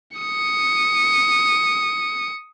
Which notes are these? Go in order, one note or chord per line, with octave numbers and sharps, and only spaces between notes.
D#6 C#7